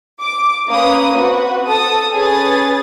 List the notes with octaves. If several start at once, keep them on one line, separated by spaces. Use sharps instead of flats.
D6
A#3 C#4 B4 D#6
C4 F#4 B4
A4 A5 D#6
C#4 G#4 B4 D#6 A6